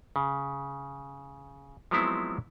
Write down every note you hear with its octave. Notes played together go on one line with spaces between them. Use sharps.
C#3
F3 F#3 G#3 B3 C4 E4